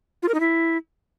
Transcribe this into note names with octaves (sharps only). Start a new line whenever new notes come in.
F4
A#4
D#4
E4